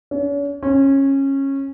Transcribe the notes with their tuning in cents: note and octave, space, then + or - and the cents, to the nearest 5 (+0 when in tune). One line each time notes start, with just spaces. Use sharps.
C#4 +40
C#4 -20